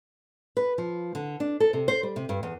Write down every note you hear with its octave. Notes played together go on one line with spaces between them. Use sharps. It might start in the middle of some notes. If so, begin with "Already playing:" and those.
B4
F3
D3
D4
A4
C3
C5
G3
C3
G2
E2